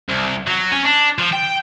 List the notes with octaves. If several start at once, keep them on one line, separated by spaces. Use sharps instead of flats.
C2
F#3
C#4
D4
F3
G5